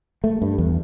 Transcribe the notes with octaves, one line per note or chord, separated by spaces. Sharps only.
A3
G2
E2